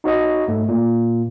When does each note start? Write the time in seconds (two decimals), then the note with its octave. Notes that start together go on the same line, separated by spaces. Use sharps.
0.04 D#4 F#4 C#5 D#5
0.48 G#2 A3
0.68 A#2